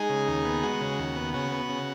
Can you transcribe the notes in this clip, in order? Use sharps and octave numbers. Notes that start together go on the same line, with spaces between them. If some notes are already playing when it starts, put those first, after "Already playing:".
Already playing: G#3 D#4 G#4
C#3
D#2
B3
G#3 F#4
C#3
D#2
B3
C#3 F#4
B3
C#3